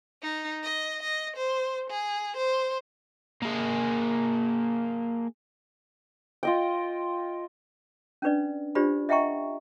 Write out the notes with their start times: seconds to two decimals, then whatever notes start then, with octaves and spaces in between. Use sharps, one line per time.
0.22 D#4
0.63 D#5
1.02 D#5
1.36 C5
1.90 G#4
2.37 C5
3.42 A#3 G#4
6.43 F4 D#5 G5
8.22 C#4 D4 B4 D5
8.75 D4 F4 G4 C5 D5 B5
9.09 D#5 E5 F#5 G5 A#5 C#6